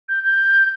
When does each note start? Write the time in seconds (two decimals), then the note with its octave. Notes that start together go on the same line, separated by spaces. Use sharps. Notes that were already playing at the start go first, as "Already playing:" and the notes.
0.08 G6
0.24 G6